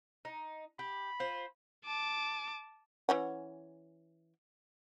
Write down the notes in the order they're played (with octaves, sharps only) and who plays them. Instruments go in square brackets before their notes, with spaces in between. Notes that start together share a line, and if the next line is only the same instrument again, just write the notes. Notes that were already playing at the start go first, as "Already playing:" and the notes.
[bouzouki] D#4
[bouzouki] G4 [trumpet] B5
[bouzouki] F4 C5
[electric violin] A5 D6
[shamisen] E3 C#4 F#5